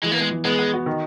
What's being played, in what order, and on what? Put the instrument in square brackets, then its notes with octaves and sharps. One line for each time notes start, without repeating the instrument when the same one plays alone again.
[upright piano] E3 [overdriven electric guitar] G#3
[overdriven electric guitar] A#3
[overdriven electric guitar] G#3 [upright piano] B3
[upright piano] E3
[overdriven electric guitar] G#3 [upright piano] B3
[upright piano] B3
F#4
D#3